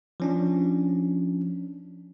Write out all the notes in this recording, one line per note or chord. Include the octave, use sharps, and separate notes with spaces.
F3 C#4 D4